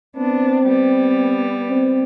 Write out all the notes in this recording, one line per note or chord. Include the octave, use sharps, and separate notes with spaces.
B3 C4 D4
G3 B3
C4